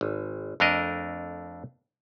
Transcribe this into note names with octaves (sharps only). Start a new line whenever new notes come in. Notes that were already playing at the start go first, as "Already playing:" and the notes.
G#1
F2 A3 D4 A#4 D#5